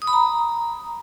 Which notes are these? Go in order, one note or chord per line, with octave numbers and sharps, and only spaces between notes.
D#6
B5
A#5